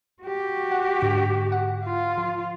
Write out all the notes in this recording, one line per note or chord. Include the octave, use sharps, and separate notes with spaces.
F#4 G4
F#5
G#2 D3 D6
F#5
F4
F3